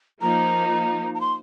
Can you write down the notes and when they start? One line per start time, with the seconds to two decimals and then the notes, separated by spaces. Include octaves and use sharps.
0.21 F3 A#3 D#4 A#5
1.14 A#5
1.21 C6